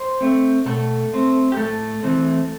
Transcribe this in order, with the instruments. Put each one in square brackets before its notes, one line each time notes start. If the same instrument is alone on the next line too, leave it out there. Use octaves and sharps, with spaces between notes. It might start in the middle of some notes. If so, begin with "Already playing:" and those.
Already playing: [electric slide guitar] C5
A3 C4
B2 A3 A4
A3 C4
G4
A2 A3 A4
E3 A3 C4